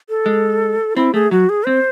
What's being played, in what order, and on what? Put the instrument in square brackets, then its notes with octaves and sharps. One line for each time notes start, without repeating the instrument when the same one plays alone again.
[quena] A4
[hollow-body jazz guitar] G#3
[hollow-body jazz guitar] C4 [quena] E4
[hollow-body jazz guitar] A3 [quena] G#4
[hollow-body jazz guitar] F#3 [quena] F#4
[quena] G#4
[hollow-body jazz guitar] C4 [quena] C5